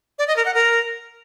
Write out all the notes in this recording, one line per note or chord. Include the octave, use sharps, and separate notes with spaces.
D5
D#5
A#4
F#5
A#4